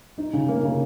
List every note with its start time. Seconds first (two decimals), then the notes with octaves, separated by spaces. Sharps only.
0.18 D#4
0.33 C#3
0.49 A#3
0.64 C#3